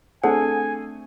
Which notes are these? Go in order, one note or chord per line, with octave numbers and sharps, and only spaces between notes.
A3 C4 D4 G#4 A4 C5 F#5 G#5